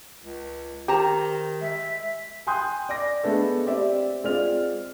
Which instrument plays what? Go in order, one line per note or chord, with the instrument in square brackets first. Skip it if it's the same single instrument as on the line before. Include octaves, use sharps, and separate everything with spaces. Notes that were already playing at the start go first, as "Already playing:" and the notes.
[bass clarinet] C#2
[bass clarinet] D#3 [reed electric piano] G4 [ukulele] C5 A5 A#5
[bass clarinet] G#3 [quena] E5
[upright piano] G5 G#5 C6 D#6 F#6 G6
D5 D6 A#6
G#3 A3 B3 D4 A4
C4 G4 D5 E5
G#3 C4 F4 D5 F6 F7